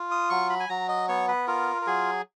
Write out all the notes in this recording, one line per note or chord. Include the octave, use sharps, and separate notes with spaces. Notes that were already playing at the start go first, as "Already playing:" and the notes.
Already playing: F4
D#6
F#3 C#6
B5
G#5
F#3 A#5
D#5
B3 C#5
B4
F4 A#4
A#4
F#3 G#4